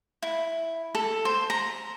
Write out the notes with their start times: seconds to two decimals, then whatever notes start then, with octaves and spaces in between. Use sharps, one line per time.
0.23 E4
0.95 A4
1.25 C5
1.50 A#5